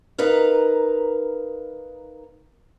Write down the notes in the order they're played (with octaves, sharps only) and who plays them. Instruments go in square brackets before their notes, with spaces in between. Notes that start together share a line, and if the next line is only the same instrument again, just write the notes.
[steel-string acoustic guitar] D#4 A#4 B4 F5